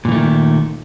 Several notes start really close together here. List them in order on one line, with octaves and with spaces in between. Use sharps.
A#2 E3 A3 D#3